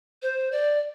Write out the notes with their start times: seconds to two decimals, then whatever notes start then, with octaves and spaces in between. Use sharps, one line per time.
0.22 C5
0.52 D5